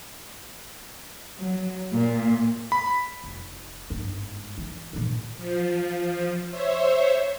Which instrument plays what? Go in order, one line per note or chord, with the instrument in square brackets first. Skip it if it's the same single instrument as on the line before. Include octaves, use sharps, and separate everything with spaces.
[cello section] F#3
A#2
[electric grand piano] B5
[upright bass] F1
G1 G#2
E3
D#2 A#2
[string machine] F3
C5 C#5 E5